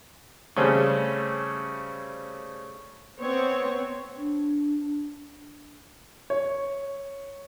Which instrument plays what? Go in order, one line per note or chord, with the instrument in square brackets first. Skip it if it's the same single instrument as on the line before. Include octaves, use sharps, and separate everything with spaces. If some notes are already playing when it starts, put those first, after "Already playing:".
[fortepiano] C#3 G3 A3 C4 C#4
[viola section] B3 C4 C#5
[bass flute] D4
[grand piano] C#5